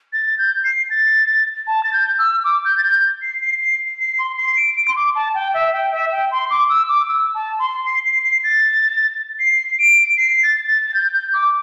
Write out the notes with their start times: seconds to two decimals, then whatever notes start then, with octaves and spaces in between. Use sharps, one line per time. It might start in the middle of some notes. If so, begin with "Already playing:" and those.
0.13 A6
0.26 A6
0.38 G6
0.64 C7
0.90 A6
1.67 A5
1.83 A6
1.93 G6
2.19 E6
2.44 D6
2.65 G6
2.78 A6
2.83 G6
3.22 C7
3.41 C7
3.61 C7
3.99 C7
4.19 C6
4.38 C7
4.57 D7
4.76 D7
4.88 C6
4.96 D6
5.15 A5
5.34 G5
5.54 E5
5.73 G5
5.92 E5
6.12 G5
6.31 C6
6.50 D6
6.70 E6
6.89 D6
7.08 E6
7.34 A5
7.59 C6
7.85 C7
8.05 C7
8.24 C7
8.44 A6
9.39 C7
9.79 D7
10.17 C7
10.43 A6
10.68 A6
10.86 A6
10.94 G6
11.14 G6
11.33 D6